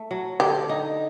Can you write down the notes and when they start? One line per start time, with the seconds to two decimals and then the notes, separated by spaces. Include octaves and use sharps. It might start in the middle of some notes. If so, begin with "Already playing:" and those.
Already playing: A3
0.11 F#3
0.40 D3 G4
0.69 D#4